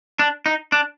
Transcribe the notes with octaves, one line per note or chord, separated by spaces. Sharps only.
D4
D#4
D4